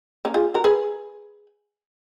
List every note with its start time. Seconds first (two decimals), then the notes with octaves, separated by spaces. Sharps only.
0.25 A#3 C#4
0.34 F4 G#4
0.54 F#4 A#4
0.64 G#4 B4